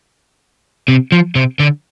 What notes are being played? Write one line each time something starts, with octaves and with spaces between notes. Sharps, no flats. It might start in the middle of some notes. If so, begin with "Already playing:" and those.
C3
F3
C3
D3